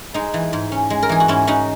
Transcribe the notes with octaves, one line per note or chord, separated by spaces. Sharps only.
G#3 D#4
E3
G#2
C#4
G#3
A#4
E3 G#4
F#4
G#2 C#4 E4
C#4 D#4 F#4